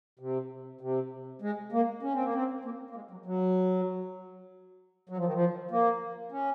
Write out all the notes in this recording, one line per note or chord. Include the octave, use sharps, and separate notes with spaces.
C3
C3
G#3
A#3
C#4
C4
A#3
C4
A#3
A#3
G#3
F#3
F#3
F#3
F3
D#3
F3
A#3
C#4